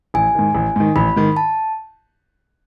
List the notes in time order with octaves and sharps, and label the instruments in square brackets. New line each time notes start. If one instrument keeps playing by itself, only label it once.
[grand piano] A1 [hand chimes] G#5
[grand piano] G#2 D#3
A1
G#2 D#3
[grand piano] A1 [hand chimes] B5
[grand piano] G#2 D#3
[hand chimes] A5